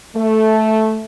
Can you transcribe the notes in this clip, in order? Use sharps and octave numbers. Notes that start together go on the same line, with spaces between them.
A3